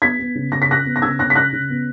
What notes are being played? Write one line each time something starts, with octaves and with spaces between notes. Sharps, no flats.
B3 G#6 B6
B3
C#3
C#3 A#6
B6
C#3 F#6 A#6
B3
A#6
C#3 E6 G#6
C#3 F#6 A#6
B6
C#3 F#6 A#6
C#3
B3